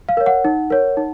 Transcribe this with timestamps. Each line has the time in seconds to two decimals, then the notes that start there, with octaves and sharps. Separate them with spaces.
0.09 F5
0.17 A#4 C#5
0.26 F#5
0.45 D#4
0.70 A#4 C#5
0.97 D#4